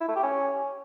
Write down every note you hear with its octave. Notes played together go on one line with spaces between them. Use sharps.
E4
A3
G4
C#4